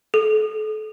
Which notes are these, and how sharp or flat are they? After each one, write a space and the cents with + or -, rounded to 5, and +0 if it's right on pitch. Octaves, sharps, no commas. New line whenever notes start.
A4 -35